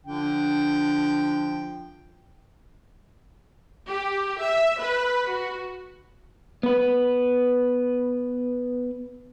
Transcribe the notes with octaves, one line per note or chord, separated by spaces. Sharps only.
D3 F3 G5
G4
E5
B4
F#4
B3 B4